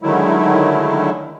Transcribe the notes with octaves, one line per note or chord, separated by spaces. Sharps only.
D3 D#3 F#3 G#3 A3 E4